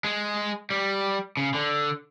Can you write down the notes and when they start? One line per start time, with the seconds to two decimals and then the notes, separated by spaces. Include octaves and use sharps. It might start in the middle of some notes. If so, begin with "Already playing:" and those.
0.04 G#3
0.70 G3
1.37 C#3
1.54 D3